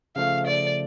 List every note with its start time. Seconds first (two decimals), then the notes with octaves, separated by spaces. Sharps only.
0.16 C#3 F3 A3 F5
0.47 D5